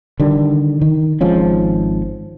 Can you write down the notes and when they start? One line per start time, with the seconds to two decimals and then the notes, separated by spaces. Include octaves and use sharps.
0.20 D3 D#3 G3
0.81 D#3
1.21 G#1 G#2 F3 C#4